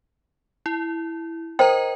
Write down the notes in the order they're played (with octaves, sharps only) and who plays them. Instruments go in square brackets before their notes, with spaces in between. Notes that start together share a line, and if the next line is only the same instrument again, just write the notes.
[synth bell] E4
[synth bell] A#4 D#5 A#5 [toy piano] C5 G5